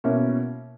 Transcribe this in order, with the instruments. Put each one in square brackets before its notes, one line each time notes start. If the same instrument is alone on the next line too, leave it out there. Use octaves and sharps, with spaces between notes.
[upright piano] B2 A#3 C#4 E4